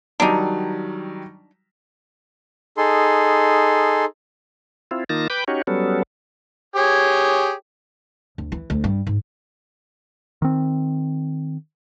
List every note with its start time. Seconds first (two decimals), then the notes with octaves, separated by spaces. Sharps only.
0.20 D#3 F#3 G3 D4 D#4
2.77 D#4 G#4 A4 C6
4.91 C4 E4 F4
5.09 D#3 A#3 D#4 F4 A5 A#6
5.30 B4 G5 B5 D6 G6
5.48 C#4 D#4 F#4 G4 C#5
5.67 F#3 G3 B3 C#4 A4
6.76 G4 G#4 C#5
8.38 D2
8.52 E3
8.70 D2
8.84 G2
9.07 G#2
10.42 D#3 C4